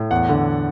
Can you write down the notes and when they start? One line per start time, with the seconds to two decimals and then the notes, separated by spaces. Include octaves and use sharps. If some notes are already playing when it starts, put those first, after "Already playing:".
Already playing: A2
0.11 E2 F#5
0.29 D3